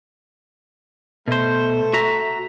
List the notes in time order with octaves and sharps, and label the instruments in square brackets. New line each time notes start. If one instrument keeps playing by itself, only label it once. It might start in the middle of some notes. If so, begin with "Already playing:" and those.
[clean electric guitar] B2 C5 [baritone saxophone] A3
[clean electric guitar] F#4 E5 A#5